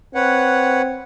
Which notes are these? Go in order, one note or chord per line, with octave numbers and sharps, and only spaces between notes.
C4 B4 C#5 F#5